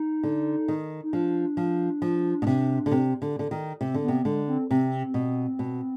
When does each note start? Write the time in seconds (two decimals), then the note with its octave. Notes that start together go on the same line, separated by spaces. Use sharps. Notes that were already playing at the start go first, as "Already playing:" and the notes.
Already playing: D#4
0.23 D3
0.68 D#3
1.03 D#4
1.13 F3 D4
1.57 F3
2.02 F3
2.42 B2
2.47 C3
2.86 D3
2.91 C3
3.22 D3
3.39 D3
3.51 D#3
3.81 C3 C4
3.94 D3
4.04 C3 B3
4.21 B3
4.25 D3 G#3
4.48 C4
4.69 C3 C4
5.14 B2
5.59 B2